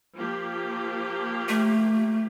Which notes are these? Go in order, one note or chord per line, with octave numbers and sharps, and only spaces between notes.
F3 A#3 G4
A3